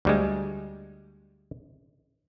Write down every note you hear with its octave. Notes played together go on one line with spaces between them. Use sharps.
D2 G3 G#3